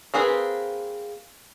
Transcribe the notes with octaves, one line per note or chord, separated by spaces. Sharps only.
A#3 C4 G#4 B4